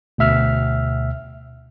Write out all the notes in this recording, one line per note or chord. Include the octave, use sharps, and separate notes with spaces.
D2 B2 E5 F6